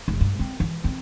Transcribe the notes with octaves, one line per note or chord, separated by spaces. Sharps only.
F1
G2
C4
E3
C4